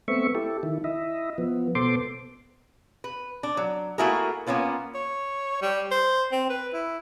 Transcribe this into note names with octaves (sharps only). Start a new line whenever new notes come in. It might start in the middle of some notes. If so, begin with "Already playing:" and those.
A3 B3 C4 E5 C#6
E4 G4 A4
D#3 E4
E4 D#5 E5
F3 B3
B2 B3 A4 C5 C6 D6
B4
D4
F#3
A3 A#3 E4 F#4 G#4 A#4
A#3 B3 C#4 F4 B4
C#5
G3
C5
C4
B4
E4